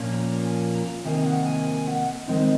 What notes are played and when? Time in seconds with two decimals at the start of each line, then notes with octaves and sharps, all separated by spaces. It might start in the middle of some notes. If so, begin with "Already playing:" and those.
Already playing: A#2 F3 A#3 C#4
0.13 A#5
0.44 G#5
0.74 A#5
1.04 C3 D#3 A#3 D#4 G#5
1.26 F#5
1.46 G#5
1.67 G#5
1.87 F#5
2.28 D#3 G#3 C4 D#4